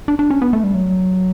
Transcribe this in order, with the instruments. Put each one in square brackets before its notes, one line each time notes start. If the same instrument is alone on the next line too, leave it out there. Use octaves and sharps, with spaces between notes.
[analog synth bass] D4
D4
C#4
B3
A3
G3
F#3